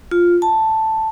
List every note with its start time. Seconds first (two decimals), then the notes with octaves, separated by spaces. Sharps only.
0.11 F4
0.42 A5